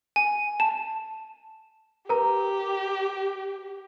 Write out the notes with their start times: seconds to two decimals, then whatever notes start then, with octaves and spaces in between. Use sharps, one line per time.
0.16 G#5
0.60 A5
2.09 G4 A#4 B4 A#5